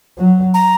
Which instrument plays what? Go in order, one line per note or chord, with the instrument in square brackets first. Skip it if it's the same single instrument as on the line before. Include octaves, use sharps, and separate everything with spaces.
[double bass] F#3
[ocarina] A#5